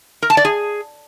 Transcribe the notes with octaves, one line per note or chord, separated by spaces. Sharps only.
A#4
A5
D5
G#4